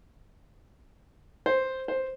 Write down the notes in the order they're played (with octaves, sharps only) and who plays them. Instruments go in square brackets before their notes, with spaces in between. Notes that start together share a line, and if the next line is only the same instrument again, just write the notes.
[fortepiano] C5
C5